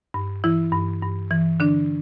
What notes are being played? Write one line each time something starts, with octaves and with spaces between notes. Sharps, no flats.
G2
E3 E4
G2
G2
E3
D3 D4